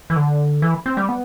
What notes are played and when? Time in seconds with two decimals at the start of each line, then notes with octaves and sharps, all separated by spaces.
0.10 E3
0.16 D3
0.62 E3
0.86 C4
0.97 G3
1.09 B3